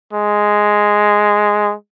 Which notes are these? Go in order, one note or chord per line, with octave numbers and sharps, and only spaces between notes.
G#3